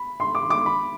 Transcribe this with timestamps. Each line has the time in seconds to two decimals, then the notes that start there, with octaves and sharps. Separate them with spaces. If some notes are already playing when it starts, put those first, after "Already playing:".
Already playing: B5
0.20 C6
0.35 D6
0.50 D6
0.66 B5